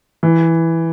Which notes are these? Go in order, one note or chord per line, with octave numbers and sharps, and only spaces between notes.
E3